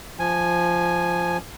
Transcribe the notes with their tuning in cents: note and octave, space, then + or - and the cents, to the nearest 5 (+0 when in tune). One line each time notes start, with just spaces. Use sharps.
F3 -5 G#5 +0